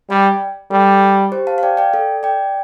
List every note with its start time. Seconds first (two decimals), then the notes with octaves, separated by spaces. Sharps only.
0.10 G3 D5 G5
0.71 G3 A4
1.32 G4 C5
1.47 F5 A5
1.58 F5
1.63 D5 G5
1.77 D5 G5
1.94 A4 D5
2.23 D5 G5